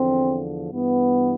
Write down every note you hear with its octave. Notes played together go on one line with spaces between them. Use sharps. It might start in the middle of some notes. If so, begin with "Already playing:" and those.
Already playing: E2 D3 F3 C4
G2 E3 B3